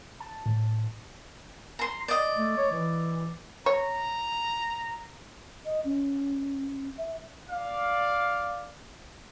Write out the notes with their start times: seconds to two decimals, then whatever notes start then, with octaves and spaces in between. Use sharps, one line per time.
0.20 A5
0.46 A2
1.79 A#5 C6
2.08 D5 D#5
2.36 A3
2.57 C#5
2.72 E3
3.66 C#5 A#5
5.65 D#5
5.85 C#4
6.97 E5
7.50 D5 F5